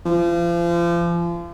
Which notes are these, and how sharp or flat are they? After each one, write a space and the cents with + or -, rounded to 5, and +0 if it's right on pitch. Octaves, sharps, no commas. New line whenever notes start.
F3 -35